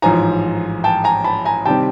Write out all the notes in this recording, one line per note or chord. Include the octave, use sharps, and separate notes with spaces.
A1 G#2 F3 G#5 A#5
G5 A5
G#5 A#5
A5 B5
G#5 A#5
C3 D#3 G3 C4 G5 A5